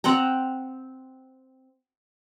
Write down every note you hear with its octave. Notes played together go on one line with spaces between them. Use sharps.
C4 F#5 G5 A#5